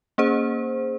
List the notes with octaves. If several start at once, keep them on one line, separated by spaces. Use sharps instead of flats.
A#3 C#4 G#4 C5